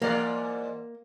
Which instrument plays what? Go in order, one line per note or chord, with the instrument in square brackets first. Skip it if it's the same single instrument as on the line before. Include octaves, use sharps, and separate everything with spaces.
[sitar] G#2 E3 D5 [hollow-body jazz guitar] A#3